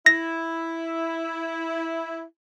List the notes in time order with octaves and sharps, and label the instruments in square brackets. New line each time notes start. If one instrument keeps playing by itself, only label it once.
[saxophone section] E4 [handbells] A#6